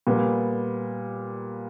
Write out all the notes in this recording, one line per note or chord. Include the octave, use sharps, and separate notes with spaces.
A#2 G3 B3